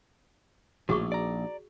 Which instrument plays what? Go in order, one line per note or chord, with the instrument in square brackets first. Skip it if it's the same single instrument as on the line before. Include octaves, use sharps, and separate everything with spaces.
[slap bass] A#1 [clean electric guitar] A2 [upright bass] D#4 [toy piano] F#4 G#4 C#6
[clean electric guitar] D5 A#5